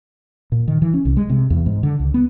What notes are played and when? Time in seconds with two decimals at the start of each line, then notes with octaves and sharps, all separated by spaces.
0.52 A#2
0.68 D#3
0.82 E3
0.94 C#4
1.05 C2
1.17 G#3
1.30 C3
1.50 E2
1.66 G#2
1.83 D3
2.00 C#2
2.14 B3